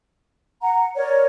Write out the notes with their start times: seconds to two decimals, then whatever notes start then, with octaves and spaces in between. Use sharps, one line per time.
0.62 F#5 A#5
0.96 A#4 C#5 D5